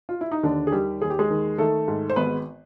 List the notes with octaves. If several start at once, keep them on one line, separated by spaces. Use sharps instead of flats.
F4
E4
D#4
D#2 D3 D4
G#4
D#3 G3 G4
D#2 G#4
G4
G#3 G#4
D#3
D#3 A3 A4
G#2
C5
G#1 B3 B4